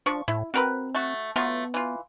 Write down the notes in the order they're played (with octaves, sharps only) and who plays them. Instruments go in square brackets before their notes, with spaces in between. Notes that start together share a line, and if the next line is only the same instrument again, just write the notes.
[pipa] F3 C#6 [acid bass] D4
[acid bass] A2 [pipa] E4
[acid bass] C4 [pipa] F#4 A#4 B4
[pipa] A3 F#4
[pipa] F#3 A3 F4 [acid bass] B3
[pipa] E3 F4